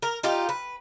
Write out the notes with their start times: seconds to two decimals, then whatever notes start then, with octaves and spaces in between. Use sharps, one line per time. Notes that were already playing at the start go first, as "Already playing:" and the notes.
0.02 A#4
0.23 D#4 F4 G4
0.49 B4